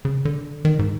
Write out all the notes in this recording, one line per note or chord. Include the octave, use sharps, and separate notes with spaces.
C#3
D3
D#3
G#2